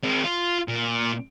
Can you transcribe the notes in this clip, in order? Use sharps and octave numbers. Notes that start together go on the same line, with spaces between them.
G#3 C4
F4
A#2